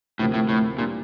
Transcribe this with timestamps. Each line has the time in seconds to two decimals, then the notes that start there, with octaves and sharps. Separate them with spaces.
0.19 D2 A2 C3 F3 A#3 D4
0.34 A2
0.49 A2
0.78 A#2 E3 G3 D4 G4